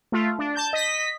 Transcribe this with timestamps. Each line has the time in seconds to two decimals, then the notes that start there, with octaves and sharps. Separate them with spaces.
0.12 A3 F4
0.39 D4
0.56 A5 G6
0.73 D#5 B6